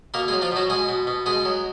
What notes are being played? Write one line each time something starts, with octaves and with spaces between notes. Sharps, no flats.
B2 A#3 A#4
G#3 G#4
F#3
F3 F4
B2 F#3 F#4
B2 G#3 G#4
B2
B2
B2 G#3 G#4
F#3